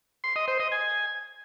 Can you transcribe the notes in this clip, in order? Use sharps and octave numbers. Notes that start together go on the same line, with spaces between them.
C6
D#5
C5
D#5
G#5